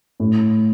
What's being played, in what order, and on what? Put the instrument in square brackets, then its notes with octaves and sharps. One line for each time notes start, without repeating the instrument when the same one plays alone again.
[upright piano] A2